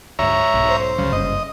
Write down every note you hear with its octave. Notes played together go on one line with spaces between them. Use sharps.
D2 G#2 C#5 E5 A#5
B1 G#2
C5
C#2 C#3 F#3
F#1 G2 C#3 D#5